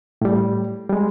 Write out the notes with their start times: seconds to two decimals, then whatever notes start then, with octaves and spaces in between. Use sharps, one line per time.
0.21 A2 G3
0.89 G3 G#3